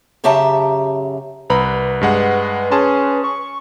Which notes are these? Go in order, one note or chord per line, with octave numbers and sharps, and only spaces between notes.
F#2 C#3 G4 E5 A5 A#5
C2 B4 A#5 B5
G2 G#3 F#5
C#4 G#4 A5 C6
C#6